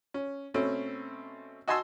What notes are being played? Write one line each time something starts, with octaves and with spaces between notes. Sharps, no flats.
C#4
B2 A3 C4 C#4
F#4 D#5 G#5 A5 C6 E6